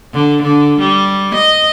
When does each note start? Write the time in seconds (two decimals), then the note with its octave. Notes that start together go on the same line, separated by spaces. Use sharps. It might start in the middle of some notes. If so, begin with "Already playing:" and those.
0.13 D3
0.43 D3
0.79 G3
1.35 D#5